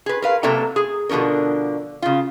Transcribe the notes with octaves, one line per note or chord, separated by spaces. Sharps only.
G#4 B4
A#4 B4 F5
C3 F#3 A#3 A4 E5 A#5
G#4
B2 D3 F3 C#4 A#4
C#3 F4